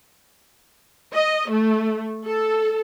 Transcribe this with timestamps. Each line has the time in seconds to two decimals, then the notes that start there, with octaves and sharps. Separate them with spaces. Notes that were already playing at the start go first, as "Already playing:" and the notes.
1.13 D#5
1.51 A3
2.25 A4